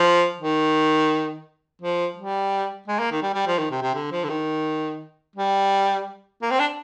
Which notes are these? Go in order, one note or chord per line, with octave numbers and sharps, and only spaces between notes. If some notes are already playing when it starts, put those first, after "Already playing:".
Already playing: F3
D#3
F3
G3
G#3
A#3
D#3
G3
G3
F3
D#3
C3
C3
D3
F3
D3
D#3
G3
A#3
C4
D4